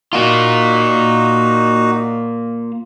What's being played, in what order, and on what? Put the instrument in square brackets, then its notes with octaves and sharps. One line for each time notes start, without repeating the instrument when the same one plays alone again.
[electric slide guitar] A#3 F4 [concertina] D#4 F#4